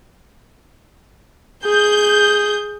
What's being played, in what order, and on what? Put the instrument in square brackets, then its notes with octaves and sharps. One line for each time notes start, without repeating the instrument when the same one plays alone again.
[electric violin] G#4 [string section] G6